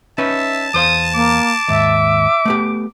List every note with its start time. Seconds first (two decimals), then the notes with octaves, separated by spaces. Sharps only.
0.18 C#4 D#4 B4 E5 A5
0.74 E2 C5 F5 D#6
1.14 A#3 D6
1.68 D#2 G#2 E5
2.45 A3 B3 G4